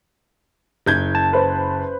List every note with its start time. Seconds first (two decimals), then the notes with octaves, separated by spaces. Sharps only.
0.86 F#1 G6 G#6
1.15 A5
1.33 B4 C5